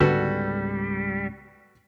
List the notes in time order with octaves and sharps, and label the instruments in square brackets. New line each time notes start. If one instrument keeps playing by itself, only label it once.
[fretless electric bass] C#2 G#2 B3 [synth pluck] D3 [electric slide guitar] G3 [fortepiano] F#4 A4 B4